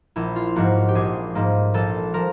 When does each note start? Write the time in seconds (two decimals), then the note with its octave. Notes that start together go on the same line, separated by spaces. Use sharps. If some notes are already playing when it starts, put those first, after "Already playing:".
0.16 A#1 E4
0.36 F4
0.56 G#2 F3 A#3 F#4
0.89 G4
0.95 A#1 G#4
1.35 G#2 F3 A#3
1.74 A#1 A4
2.14 F3 A#4